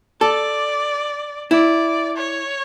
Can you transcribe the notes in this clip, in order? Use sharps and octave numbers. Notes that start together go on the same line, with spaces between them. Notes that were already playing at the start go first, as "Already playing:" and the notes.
A4 D5
E4 D5
C#5